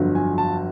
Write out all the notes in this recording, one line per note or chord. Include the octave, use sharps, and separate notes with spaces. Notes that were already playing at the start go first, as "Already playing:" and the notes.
Already playing: G1 F2 D3 F#3
G#5
A5